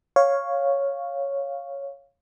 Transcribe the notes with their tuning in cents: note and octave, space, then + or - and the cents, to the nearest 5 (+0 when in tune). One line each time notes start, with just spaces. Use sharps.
C#5 +0 F5 +0